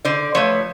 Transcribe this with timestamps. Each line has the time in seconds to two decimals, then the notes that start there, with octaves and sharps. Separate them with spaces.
0.05 D3 C5 D5
0.34 F3 A3 B4 C#5